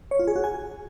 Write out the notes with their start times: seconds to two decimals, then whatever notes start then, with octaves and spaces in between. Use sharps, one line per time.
0.11 C#5
0.19 F4
0.27 G#4
0.36 F#4
0.44 G#5